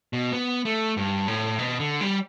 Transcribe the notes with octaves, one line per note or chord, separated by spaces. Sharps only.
B2
B3
A3
G2
A2
B2
D3
G3